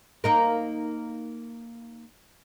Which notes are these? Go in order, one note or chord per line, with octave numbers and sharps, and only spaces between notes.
A#3 D#4 A#4